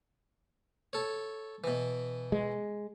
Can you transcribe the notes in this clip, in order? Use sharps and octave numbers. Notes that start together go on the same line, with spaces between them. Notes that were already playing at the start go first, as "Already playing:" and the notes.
A4 C#5
B2 E3
G#3